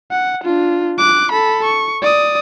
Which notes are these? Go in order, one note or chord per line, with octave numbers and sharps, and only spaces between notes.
F#5
D4 F4
D6 F#6
A4 B5
C#6
D5 D#6